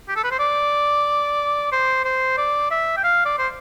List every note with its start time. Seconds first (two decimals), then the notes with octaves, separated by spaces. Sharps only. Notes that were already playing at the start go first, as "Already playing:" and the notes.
0.09 G4
0.16 A4
0.24 B4
0.31 C5
0.39 D5
1.72 C5
2.05 C5
2.38 D5
2.71 E5
2.97 G5
3.04 F5
3.25 D5
3.39 C5